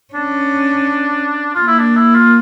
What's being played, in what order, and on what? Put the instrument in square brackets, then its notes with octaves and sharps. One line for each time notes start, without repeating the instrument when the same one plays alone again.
[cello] C#4 [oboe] D4
[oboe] F4
[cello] A#3
[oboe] E4
D4
E4
F4